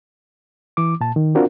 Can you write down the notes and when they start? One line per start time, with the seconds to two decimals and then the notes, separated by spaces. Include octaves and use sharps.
0.77 E3 D6
1.01 A#2 A5
1.16 D#3
1.35 C4 D4 F4 F#4 A#4